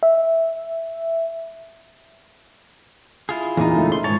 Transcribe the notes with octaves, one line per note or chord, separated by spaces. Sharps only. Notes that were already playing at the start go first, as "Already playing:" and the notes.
E5
E4 F4 G#4
E2 A#2 D#4
C#3 A3
C6
G#2 D#3 F3 C#5 A5